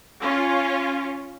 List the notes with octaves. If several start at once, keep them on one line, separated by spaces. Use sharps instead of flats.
C#4 F4